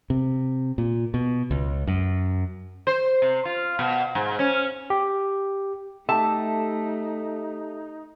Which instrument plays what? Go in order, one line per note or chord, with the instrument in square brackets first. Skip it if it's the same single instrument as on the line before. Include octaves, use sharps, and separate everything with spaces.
[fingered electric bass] C3
A#2
B2
C#2
F#2
[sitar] C5
C3
F4
B2
G#2
C#4
[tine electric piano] G4
[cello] A3 [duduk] D#4 [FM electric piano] G4 A4 E5 [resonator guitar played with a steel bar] A5